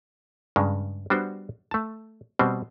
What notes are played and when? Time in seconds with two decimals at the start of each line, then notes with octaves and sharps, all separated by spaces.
0.56 G2 C#3 G#3
1.10 G3 B3 D4 F#4 C5
1.71 A3 A5
2.39 B2 G3 B3 C4 C5